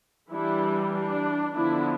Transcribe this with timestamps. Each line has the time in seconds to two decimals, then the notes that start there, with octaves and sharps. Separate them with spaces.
0.31 E3 G3 D4 E4
0.93 D4
1.55 D3 F3 B3 D4 E4